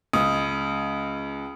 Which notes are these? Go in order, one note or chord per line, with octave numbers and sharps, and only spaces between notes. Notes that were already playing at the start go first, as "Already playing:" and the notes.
C#2 D#6